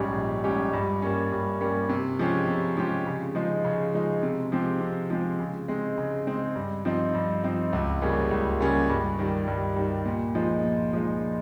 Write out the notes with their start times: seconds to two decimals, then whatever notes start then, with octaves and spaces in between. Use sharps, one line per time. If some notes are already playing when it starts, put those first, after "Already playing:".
Already playing: A#1 G#2 G3 C#4 G4
0.15 A#1
0.44 G#2 G3 C#4 G4
0.73 G2
1.02 G3 A#3 C#4
1.32 G2
1.61 G3 A#3 C#4
1.89 C3
2.19 F3 G#3 C#4 G4
2.48 C3
2.77 F3 G#3 C#4 G4
3.06 C#3
3.35 F3 G#3 D#4
3.65 C#3
3.94 F3 G#3 D#4
4.23 C3
4.52 F3 G#3 C4 G4
4.81 C3
5.10 F3 G#3 C4 G4
5.40 C#3
5.68 G#3 C4 D#4
5.98 C#3
6.27 G#3 C4 D#4
6.55 G2
6.85 F3 C4 D#4
7.15 G2
7.44 F3 C4 D#4
7.73 C#2
8.01 C#3 G3 A#3 C#4
8.31 C#2
8.60 C#3 G3 A#3 C#4
8.89 G2
9.19 D#3 G3
9.47 G2
9.76 D#3 G3
10.05 A#2
10.35 F3 G#3 D#4
10.64 A#2
10.93 F3 G#3 D#4